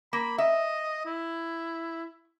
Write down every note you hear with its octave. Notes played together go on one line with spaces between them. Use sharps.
A#3 B5
D#5 E5
E4